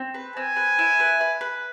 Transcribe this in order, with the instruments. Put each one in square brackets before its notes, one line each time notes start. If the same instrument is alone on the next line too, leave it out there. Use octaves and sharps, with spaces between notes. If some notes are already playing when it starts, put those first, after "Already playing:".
Already playing: [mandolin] C4
B4
[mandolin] C4 [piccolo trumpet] G#5
[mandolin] B4
E4
B4
B4
B4